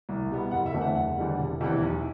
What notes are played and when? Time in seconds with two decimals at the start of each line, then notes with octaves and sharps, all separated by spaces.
0.09 C2
0.30 B2 G3 B3
0.51 F#1 F#5
0.66 E5
0.73 E2 D3 A3 C4
0.81 F#5
0.95 F#1 F#5
1.17 E2 D3 G3
1.39 E1
1.61 E2 C3 E3
1.81 B1